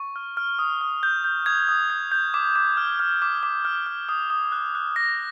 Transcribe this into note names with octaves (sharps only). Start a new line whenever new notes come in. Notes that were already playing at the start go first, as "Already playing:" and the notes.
Already playing: C#6
F6
F6
D#6
D#6
G6
G6
D#6 G#6
D#6
G6
G6
D6
D6
F6
F6
D6
D6
F6
F6
D#6
D#6
F#6
F#6
D#6 A#6